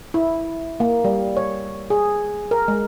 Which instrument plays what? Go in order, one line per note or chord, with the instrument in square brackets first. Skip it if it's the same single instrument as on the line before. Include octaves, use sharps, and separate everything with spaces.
[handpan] E4
A#3
G3
C#5
G#4
A#4
G#3